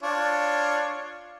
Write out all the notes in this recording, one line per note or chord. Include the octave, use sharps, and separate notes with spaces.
D4 F4 C#5